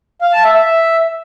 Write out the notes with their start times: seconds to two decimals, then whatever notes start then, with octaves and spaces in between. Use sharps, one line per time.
0.22 F5
0.33 A5
0.44 E5
0.55 E5